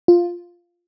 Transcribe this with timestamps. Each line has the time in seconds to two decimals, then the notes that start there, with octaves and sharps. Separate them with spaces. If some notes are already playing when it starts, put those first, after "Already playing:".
0.08 F4